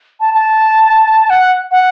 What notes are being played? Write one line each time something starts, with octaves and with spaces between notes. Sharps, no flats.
A5
A5
F#5
F#5